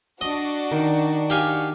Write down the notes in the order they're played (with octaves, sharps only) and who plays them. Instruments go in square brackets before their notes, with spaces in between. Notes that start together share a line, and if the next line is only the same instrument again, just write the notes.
[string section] D4 F#4 [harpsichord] D#5
[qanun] D#3
[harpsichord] G4 F5 G#5